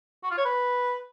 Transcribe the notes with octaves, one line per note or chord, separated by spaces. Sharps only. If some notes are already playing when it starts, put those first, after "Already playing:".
F#4
F4
C#5
B4